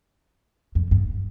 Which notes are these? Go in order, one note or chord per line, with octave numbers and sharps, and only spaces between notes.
F2
G2